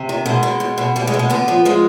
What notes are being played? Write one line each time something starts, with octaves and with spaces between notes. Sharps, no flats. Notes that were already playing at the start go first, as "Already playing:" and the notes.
Already playing: C3
D#3
B2 G#3
B2
B2
B2
B2 G3
G#3
B2
G#3
D3 B3
F3
F3 G#3